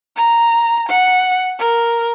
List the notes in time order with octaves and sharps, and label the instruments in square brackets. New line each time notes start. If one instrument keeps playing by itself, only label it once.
[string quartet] A#5
F#5
A#4